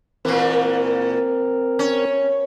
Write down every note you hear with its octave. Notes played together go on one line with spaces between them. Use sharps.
A#2 E3 C4 A#4
C#4